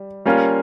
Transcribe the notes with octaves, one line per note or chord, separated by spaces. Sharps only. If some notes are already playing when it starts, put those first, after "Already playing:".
Already playing: G3
G3 A#3 C#4 F4